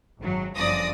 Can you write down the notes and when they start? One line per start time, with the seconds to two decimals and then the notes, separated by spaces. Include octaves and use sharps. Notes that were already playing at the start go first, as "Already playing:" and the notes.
0.19 G#1 F#3
0.56 G1 F#2 F3 D5 D#6 A#6